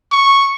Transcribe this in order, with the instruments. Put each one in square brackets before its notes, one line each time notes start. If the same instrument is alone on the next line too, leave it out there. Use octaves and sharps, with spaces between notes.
[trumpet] C#6